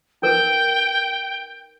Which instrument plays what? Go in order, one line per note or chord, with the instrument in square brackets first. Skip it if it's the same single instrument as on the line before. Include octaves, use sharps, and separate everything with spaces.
[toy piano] D#4 A#4 B4 [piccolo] G5